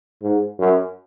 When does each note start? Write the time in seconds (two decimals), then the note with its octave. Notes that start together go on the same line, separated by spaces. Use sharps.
0.23 G#2
0.59 F#2